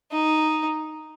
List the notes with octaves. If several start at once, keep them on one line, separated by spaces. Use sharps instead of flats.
D#4